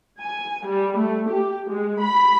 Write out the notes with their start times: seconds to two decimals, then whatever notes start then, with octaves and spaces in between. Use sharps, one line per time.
0.20 G#5
0.66 G3
0.97 A3
1.30 G4
1.70 G#3
2.00 B5